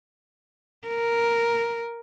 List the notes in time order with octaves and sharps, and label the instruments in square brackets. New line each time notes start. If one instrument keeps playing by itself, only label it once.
[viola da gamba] A#4